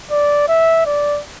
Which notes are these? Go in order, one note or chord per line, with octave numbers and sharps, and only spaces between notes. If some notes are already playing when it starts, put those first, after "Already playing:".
D5
E5
D5